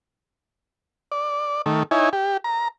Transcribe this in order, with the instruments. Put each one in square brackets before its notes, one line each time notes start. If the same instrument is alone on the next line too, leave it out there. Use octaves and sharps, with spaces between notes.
[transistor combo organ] D5
D#3 A3
D#4 E4 C#5 G#5
G4
A#5